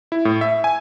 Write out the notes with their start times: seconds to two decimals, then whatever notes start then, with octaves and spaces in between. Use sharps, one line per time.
0.12 E4
0.25 A2
0.41 E5
0.64 G#5